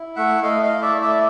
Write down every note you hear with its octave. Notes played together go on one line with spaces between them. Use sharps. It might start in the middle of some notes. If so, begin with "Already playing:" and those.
Already playing: E4
A3 E5 F#5
A3 D#5 F5
D#5 F5
E4
D5 E5
A3
D5 E5